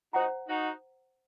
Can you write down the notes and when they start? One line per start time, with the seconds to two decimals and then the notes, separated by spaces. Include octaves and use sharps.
0.13 D#4 F#4 C5 F#5 A#5
0.48 D#4 F#4